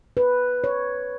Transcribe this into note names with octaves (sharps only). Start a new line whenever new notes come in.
B4
C#5